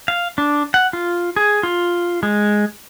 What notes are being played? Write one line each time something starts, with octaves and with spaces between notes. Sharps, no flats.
F5
D4
F#5
F4
G#4
F4
G#3